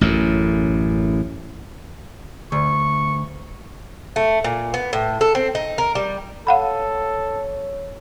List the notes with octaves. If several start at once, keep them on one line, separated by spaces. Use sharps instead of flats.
A1 F#2 A2
D2 C#6
A3
A#2
B3
A2
A4
C4
D#4
A#4
G3
A4 C#5 F5 F#5 B5